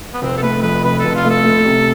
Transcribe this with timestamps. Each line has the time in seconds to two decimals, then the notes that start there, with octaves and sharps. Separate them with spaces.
0.13 B3
0.22 F1 C4
0.37 A4
0.42 A3 B4
0.63 F2 B4
0.84 F1 B4
0.99 A4
1.04 F1
1.15 F4
1.25 A3 A4
1.45 A3
1.66 C3